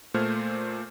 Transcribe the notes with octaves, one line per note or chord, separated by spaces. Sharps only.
A#2 A3 C5 F6 G#6